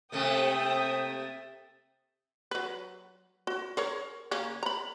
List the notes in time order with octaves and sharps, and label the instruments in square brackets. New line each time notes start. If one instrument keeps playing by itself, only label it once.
[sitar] C3 A3 A#3 [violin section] E5 G5 D#6
[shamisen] F#3 B4
F#4
G#4 A#4 C#5
C#3 A#3 C#4
A#5 B5